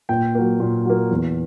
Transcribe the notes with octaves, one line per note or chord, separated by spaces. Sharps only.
A#2 G5
F#3 A#3
A#2
F#3 A#3
E2